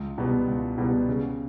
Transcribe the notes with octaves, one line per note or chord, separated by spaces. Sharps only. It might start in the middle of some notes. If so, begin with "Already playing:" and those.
Already playing: C#2
B2 G3 B3
C#2
B2 G3 B3
C#3